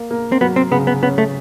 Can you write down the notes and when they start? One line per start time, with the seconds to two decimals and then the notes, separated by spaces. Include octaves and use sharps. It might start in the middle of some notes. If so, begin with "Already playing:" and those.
Already playing: A#3
0.11 A#3
0.32 C4
0.41 F#3 B3
0.56 C4
0.71 C#3 B3
0.87 B3
1.02 B3 C#4
1.18 A3